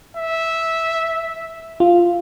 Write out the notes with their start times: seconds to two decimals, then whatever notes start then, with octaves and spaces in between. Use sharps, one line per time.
0.17 E5
1.80 F4